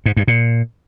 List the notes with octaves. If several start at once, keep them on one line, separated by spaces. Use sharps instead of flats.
G#2
G2
A#2